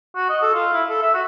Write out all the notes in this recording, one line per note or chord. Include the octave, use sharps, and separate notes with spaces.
F#4
D#5
A4
F4
E4
A4
E5
F#4